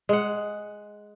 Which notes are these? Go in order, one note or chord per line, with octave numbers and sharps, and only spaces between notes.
G#3 F#5